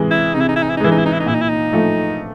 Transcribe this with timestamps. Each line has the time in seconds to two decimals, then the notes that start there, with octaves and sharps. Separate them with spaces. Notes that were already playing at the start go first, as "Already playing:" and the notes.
Already playing: C3 E3 G#3
0.11 E4
0.34 C3 D#4
0.40 E4
0.49 D#4
0.56 E4
0.63 D#4
0.70 E4
0.77 D#4
0.80 E3 G#3 E4
0.92 D#4
0.98 E4
1.06 D#4
1.13 E4
1.20 D#4
1.26 A#2 E4
1.34 D#4
1.41 E4
1.49 D#4
1.73 F3 A3